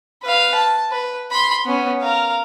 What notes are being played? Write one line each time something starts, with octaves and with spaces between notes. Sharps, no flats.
B4 F5
A5
B4
B5 C6
B3 C#4
A#4 F5